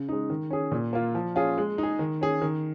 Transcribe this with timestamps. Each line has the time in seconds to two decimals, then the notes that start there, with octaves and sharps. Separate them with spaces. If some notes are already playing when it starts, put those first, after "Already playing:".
Already playing: C#3
0.09 G#3 D#4
0.30 D#3
0.50 C#4 G#4
0.72 A#2
0.93 A#3 F4
1.15 F3
1.35 C#4 F4 G#4
1.58 G#3
1.78 D#4 G#4
1.99 D#3
2.21 C#4 G#4
2.42 D#3